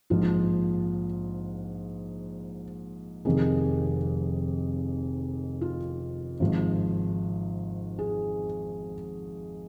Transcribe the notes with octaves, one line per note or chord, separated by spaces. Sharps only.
A#1 G#2 F3 F4
F1 F2 D#3 G#4
F4
G#1 G#2 F3
G#4